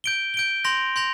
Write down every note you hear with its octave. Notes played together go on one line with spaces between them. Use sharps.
G6 D7 G7
G6 D7 G7
C6 G6 A#6 F7
C6 G6 A#6 F7